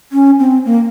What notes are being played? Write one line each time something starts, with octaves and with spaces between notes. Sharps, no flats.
C#4
C4
A#3